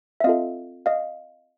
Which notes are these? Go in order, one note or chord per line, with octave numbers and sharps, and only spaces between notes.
E5
C4 F4 A4 D#5 F5
D#5 F5